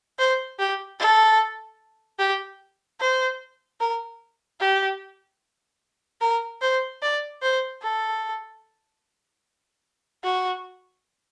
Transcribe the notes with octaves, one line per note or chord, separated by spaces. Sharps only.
C5
G4
A4
G4
C5
A#4
G4
A#4
C5
D5
C5
A4
F#4